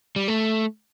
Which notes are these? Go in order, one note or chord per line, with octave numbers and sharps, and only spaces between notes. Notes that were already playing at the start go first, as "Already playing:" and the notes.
G3
A3